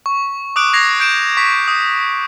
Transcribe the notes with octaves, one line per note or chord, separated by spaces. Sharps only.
C#6
D6 D#6 F#6 D7
G#6 A#6 C7 F7
G6 D7 E7
C#6 B6
D#6